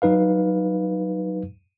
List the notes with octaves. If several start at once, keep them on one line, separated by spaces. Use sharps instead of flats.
F#3 D#4 B4 F5